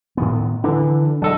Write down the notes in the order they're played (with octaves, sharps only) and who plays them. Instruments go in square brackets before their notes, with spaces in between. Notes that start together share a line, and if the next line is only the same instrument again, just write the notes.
[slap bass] A2 D#3 B3
[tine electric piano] D3 E3 [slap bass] D4
[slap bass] E1 F#3 [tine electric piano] D4 A4 D#5